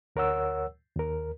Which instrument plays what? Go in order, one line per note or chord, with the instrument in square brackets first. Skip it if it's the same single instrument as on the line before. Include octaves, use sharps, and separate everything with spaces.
[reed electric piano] D2 A#4 C#5 F#5 E6
D#2 A#4